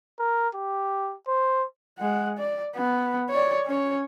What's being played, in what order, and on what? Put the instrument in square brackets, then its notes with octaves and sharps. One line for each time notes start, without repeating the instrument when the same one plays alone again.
[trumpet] A#4
G4
C5
[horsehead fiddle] G#3 F#5
D5
B3
C#5 D5
C#4 C#5